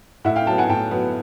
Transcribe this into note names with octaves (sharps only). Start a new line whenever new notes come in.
A2 E5 F#5
F5 G5
F#3 B3 G5 A5
F#5 G#5
A2 G5 A5
F#3 B3